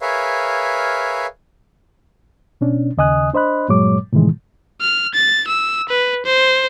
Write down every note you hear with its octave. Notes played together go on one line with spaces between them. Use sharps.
G#4 A#4 B4 C#5 E5 F5
B2 C#4 D4
D#2 C#3 D#5 G#5 D#6 F#6
D4 C5 D#5 B5 F#6
G2 A#2 F#3 G#3 C#5 D6
A2 C3 D#3 E3 G#3
F6
A6
E6
B4
C5